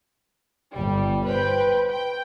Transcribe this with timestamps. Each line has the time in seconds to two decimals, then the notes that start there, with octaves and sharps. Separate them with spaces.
0.72 G1 G3
1.26 B4 C5 G5
1.89 G5